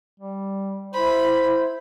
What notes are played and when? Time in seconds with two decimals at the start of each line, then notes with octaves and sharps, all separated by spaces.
0.20 G3
0.94 E4 C5 B5